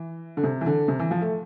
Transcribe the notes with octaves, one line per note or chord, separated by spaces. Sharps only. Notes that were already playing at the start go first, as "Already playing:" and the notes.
Already playing: E3
D3
C3
E3
D3
C3
E3
F3
A3